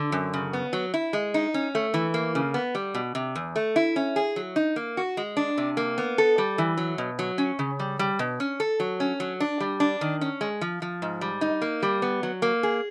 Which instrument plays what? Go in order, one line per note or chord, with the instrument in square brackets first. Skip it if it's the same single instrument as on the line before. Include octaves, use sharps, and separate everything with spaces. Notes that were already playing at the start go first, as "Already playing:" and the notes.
Already playing: [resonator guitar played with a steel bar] D3
F#2
C#3
B3
F#3
E4
G#3
D#4
C#4
A3
E3
A#3
C#3
B3
G3
B2
C3
E2
A3
E4
C#4
G#4
F#3
D#4
A#3
F#4
G#3
D4
C3
A#3
B3
A4
G3
E3
F#3
B2
F#3
C#4
C#3
G3
G3
B2
C#4
A4
F#3
C#4
F#3
D4
G3
D4
D#3
C#4
G#3
F3
F3
G#2
G3
D#4
A#3
G3
B3
F#3
A#3
G#4